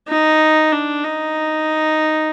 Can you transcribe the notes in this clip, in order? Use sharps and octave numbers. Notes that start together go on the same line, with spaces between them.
D#4
D4
D#4